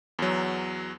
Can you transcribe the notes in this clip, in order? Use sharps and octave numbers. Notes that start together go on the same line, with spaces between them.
E2 F#3